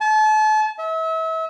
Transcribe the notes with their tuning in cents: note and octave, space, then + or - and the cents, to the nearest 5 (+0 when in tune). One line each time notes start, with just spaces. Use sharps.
A5 -35
E5 -35